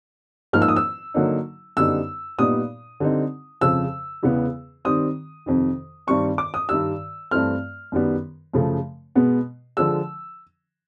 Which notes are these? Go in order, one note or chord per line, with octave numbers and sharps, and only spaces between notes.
G#2 F3 A#3 D#4 F6
E6
D#6
E6
D3 F#3 A#3 D#4
F#2 D3 G3 B3 D#4 E6
A#2 G3 B3 D#4 D#6
D3 G3 C4 D#4
F2 C#3 F3 E6
E2 C#3 E3 G#3 B3
D#3 G3 C4 D#6
F2 C3 D#3
G2 D#3 G3 C4 C#6
D6
D#6
G2 D#3 G3 E6
G2 E3 A3 C4 F6
F#2 D#3 G3 B3
F#2 C#3 F3 A3
B2 G#3 B3
D3 F3 G#3 E6